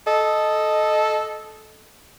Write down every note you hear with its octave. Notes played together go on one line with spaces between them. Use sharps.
A4 D#5